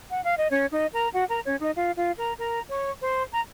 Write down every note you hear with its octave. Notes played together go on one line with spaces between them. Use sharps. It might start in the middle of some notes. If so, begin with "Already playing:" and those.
F#5
F5
D#5
C#4 C#5
D#4 D#5
A#4 A#5
F#4 F#5
A#4 A#5
C#4 C#5
D#4 D#5
F4 F5
F4 F5
A#4 A#5
A#4 A#5
C#5 C#6
C5 C6
A#5